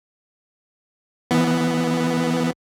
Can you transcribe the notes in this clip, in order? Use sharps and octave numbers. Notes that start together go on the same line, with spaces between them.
E3 B3